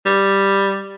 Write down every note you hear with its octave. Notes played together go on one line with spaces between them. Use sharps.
G3